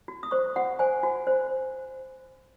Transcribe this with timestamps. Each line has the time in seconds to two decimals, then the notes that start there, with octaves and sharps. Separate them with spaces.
0.08 F#4
0.23 D#6
0.31 C5 C#6
0.56 F#4 F#5
0.79 C5 G#5
1.03 F#4
1.27 C5